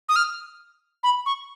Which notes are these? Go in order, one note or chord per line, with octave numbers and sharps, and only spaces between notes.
D#6
F6
B5
C#6